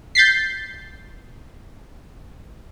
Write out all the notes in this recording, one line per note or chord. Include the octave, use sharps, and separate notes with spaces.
G6 A6 B6 C7